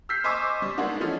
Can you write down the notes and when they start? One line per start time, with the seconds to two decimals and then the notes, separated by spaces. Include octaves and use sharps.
0.09 E6 F6 G6 B6 C7
0.24 C5 D#5 G#5 C#6 D6 E6
0.62 G3
0.78 G#3 A#3 B3 D4 D#4
1.00 E3 F3 A3 C#4 D#4